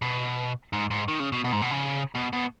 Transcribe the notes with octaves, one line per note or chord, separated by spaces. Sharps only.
B2
G#2
G#2
D#3
C#3
B2
B2
G#2
B2
C#3
B2
B2